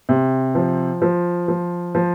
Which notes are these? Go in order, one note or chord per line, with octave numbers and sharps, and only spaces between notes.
C3
F3
F3
F3
F3